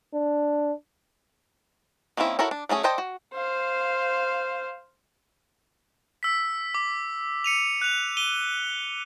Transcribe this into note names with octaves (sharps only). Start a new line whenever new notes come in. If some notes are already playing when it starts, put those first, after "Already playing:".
D4
D#3 A#3 C4 C#4 E4
E4 F#4 A4 A#4 C#5
D4
F#3 A3 C#4 G#4
A4 C5 D5 D#5 G5
F#4
C5 F5
E6 B6
D6
C#7 D#7 F7
F#6 F7
D#7 G7